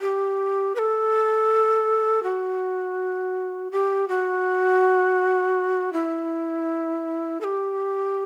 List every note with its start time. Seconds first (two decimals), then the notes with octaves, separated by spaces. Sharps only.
0.01 G4
0.75 B4
0.79 A4
2.23 F#4
3.71 G4
4.08 F#4
5.93 E4
7.41 A4
7.44 G4